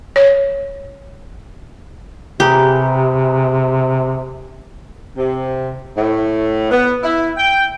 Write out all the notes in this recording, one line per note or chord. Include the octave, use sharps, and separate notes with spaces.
C#5
C3 G4 G#4 B4 A#5
C3
A2
B3
E4
G5